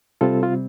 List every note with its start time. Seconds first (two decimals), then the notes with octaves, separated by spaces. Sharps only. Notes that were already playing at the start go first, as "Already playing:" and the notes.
0.21 C3 G3 C4 F4 A4
0.43 F4